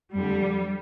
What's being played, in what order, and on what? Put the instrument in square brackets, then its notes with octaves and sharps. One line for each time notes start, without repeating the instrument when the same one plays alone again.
[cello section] F2 D3 G3